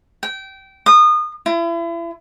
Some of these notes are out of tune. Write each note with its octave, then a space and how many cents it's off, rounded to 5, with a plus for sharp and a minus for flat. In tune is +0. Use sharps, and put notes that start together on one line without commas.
G5 -20
D#6 -30
E4 +35